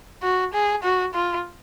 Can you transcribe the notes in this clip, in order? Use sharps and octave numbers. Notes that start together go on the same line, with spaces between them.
F#4
G#4
F#4
F4